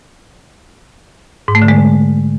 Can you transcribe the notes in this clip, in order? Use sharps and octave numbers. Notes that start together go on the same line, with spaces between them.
G#2
A3
D3
G#3